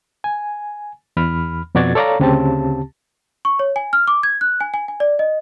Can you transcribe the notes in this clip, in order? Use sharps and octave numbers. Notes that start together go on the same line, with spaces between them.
G#5
E2 B5 F6
F2 B2 F#4 D5 G#6 A6
A4 C#5 D5 F5 A#5
D2 C#3 C4 G4 A5
C#6
C#5
G#5
F6
D6
G#6
F#6
G#5
G#5
G#5
D5
D#5